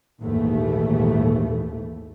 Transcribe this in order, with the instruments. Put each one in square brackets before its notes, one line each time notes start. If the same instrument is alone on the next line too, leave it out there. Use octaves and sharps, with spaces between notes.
[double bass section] A#1 D#2 G#2 E3 A3